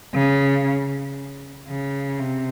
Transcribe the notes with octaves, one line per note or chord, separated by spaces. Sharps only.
C#3
C#3
C3